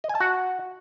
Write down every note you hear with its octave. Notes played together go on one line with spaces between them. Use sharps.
D#5
G#5
A5
F#4